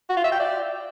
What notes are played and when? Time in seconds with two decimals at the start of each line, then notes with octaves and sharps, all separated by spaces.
0.09 F#4
0.17 F4
0.24 E5
0.32 G5
0.39 D5